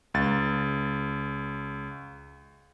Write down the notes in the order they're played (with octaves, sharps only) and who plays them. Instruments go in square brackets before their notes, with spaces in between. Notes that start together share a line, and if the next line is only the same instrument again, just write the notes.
[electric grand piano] C#2 A6